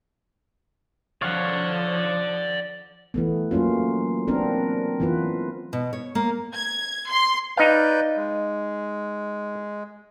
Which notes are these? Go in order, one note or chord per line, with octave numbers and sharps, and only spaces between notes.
F3 C#5 D5 F5 F#5
E3 A3 B3
F#3 A#3 C#4 F4
B3 C4 D4 A#4
E3 B3 F4 B4
B2
C#5
A#3
G#6
C6
D#4 B4 D5 F5 G6
G#3